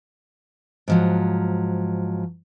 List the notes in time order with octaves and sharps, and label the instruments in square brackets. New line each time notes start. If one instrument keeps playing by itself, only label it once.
[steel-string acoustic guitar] G#2 F3 F#3